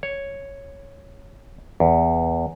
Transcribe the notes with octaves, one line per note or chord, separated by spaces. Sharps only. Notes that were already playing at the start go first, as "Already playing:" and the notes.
C#5
E2